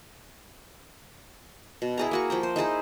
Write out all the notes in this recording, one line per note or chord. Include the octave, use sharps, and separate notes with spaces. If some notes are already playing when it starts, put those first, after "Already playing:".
B2
E4 G#4 A#5
A#3 F#4 C#6
F3 G5 A#5
C5
D#4 E4 G#4 C5